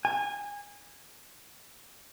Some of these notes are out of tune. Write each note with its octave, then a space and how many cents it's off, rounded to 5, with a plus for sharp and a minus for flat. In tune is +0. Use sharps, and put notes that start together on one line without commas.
G#5 -25